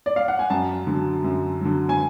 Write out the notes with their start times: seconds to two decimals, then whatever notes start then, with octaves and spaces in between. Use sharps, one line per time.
0.06 D5
0.16 F5
0.28 F#5
0.39 G#5
0.50 F#2 A5
0.87 D3 F#3
1.24 F#2
1.61 D3 F#3
1.89 G#5